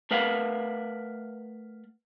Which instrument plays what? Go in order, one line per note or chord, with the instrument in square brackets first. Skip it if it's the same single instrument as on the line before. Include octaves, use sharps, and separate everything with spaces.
[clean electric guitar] A3 A#4 B4 F5 F#5